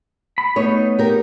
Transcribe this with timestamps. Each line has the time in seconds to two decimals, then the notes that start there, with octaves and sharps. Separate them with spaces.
0.38 B5
0.56 A3 B3 D#4 C#5
0.99 G4 A#4